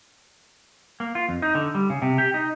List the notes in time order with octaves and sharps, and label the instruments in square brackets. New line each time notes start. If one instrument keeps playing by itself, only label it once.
[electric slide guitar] A#3
F4
F2
D#4
D3
G3
C#3
C3
G4
D#4